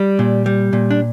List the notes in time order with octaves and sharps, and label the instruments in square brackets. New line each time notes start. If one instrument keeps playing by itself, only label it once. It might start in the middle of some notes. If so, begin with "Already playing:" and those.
Already playing: [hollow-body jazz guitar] G3
A#2
G3
A#2
D4